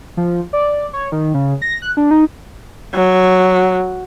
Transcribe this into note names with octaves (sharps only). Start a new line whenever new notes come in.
F3
D5
C#5
D#3
C#3
A#6
F#6
D4
D#4
F#3